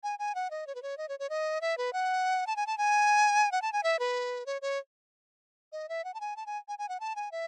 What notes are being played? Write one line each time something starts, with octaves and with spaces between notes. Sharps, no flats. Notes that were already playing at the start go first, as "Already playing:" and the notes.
G#5
G#5
F#5
D#5
C#5
B4
C#5
D#5
C#5
C#5
D#5
E5
B4
F#5
A5
G#5
A5
G#5
F#5
A5
G#5
E5
B4
C#5
C#5
D#5
E5
F#5
A5
G#5
A5
G#5
G#5
G#5
F#5
A5
G#5
E5